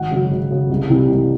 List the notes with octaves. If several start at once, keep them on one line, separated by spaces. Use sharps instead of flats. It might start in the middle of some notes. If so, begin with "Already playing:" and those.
Already playing: G#1 F#5
F#2 C#3 F#3
G#1
F#2 C#3 F#3
C2
C3 E3 G3
C2